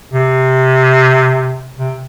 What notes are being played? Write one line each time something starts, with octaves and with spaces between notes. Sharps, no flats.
C3
C3